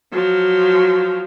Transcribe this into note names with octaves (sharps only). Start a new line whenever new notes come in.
F3 F#3